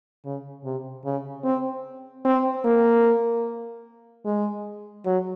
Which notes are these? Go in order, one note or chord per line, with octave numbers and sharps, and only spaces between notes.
C#3
C3
C#3
C4
C4
A#3
G#3
F#3